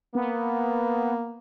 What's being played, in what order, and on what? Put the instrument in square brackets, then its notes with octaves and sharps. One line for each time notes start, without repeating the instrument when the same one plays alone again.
[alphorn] A#3 [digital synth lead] B3